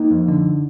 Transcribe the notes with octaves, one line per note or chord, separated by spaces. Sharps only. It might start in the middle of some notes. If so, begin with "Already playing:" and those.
Already playing: A#3 D#4
F2
D3